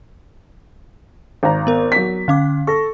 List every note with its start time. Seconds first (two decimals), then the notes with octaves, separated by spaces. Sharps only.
1.43 G#1 A#5
1.67 B3 A#4
1.92 F#3 B6
2.28 D3 C#4 F5 D6
2.67 A4 C#6 A#6